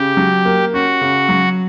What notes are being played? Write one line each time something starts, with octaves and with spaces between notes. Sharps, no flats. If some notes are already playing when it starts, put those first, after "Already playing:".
Already playing: C#3 G4
F#3
A#3
C#4 F#4
C#3
F#3